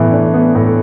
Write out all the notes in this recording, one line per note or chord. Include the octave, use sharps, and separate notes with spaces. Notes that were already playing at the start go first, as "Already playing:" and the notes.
Already playing: A2 E3 B3
D4
B3
A2